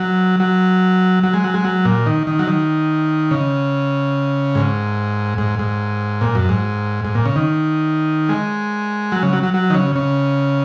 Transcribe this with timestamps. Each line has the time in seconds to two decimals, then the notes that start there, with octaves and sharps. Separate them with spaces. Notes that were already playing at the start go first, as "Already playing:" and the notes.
Already playing: F#3
0.40 F#3
1.23 F#3
1.34 G#3
1.44 F#3
1.54 G#3
1.64 F#3
1.85 A#2
2.06 D#3
2.27 D#3
2.39 F#3
2.47 D#3
3.31 C#3
4.55 G#2
5.38 G#2
5.59 G#2
6.21 A#2
6.35 F#2
6.49 G#2
7.05 G#2
7.15 A#2
7.26 C#3
7.36 D#3
8.29 G#3
9.12 F#3
9.23 C#3
9.33 F#3
9.43 F#3
9.54 F#3
9.70 D#3
9.75 C#3
9.96 C#3